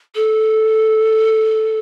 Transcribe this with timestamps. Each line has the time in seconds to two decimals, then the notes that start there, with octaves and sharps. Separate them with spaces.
0.15 A4